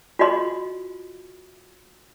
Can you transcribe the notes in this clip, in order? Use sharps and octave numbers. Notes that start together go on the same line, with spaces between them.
F4 F#4 D#5 C6